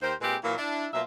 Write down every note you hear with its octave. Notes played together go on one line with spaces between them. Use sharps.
D#2 G4 A#4 C5
A#2 G#3 C4 G4 G#4 B4
A#2 E3 F#3 A#3
D4 E4
B2 F#3 A#3 F4 E5